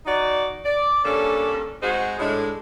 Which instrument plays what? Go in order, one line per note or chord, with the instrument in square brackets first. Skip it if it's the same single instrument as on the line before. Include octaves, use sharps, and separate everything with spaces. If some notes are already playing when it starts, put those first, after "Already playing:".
[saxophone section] D#4 F#4 D5
D5
C#3 G3 A#3 C#4 D4 A4
G#3 C4 D#4 F#4 G#4 C5
A2 G#3 D4